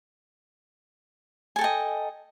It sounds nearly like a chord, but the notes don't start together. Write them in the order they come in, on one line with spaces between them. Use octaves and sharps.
G#5 A4 G5 D#5